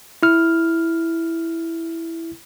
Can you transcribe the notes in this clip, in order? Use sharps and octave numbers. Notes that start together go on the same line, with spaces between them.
E4 F6